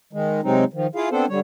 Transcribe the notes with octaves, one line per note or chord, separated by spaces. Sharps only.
D#3 G#3
C3 F#3 G#3 C4 D#4
D#3 F3
E4 F4 G#4 F5
B3 C4 D4 A4 C5
D3 G3 C#5